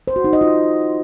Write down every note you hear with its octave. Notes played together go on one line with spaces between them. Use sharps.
C5
F#4
D#4
D#5
F4